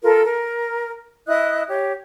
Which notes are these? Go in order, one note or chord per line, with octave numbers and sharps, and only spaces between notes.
F4 A4 A#4
A#4
E4 D#5 D#6 F#6
G4 C#5